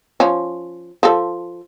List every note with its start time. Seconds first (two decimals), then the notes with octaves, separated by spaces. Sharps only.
0.20 F3 C#4
1.03 F3 A4